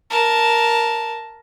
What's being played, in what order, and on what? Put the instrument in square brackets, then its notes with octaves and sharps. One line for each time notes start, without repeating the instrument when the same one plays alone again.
[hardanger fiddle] A#4 A5